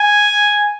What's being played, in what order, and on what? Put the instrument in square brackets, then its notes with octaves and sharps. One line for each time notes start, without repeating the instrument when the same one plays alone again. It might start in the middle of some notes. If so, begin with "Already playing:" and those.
Already playing: [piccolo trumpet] G#5